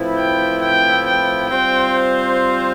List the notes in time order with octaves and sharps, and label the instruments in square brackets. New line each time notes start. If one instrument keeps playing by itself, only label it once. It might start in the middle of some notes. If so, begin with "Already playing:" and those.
Already playing: [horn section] A2 F3 C4 E4 B4
[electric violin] G5
G5
G5
[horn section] G3 C4 F4 C5 [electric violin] G5